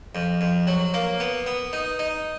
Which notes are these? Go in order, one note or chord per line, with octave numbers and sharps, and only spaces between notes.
F2
F2
F#3
A#3
B3
B3
D#4
D#4